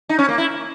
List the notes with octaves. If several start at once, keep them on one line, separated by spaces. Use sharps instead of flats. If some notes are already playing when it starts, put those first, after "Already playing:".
D#4
C#4
A#3
E4